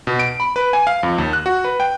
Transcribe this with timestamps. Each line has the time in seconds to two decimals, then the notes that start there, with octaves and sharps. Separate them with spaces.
0.07 B2
0.19 D7
0.40 B5
0.56 B4
0.73 G#5
0.87 F5
1.03 F2
1.18 D#2
1.33 F#6
1.46 F#4
1.64 B4
1.80 G5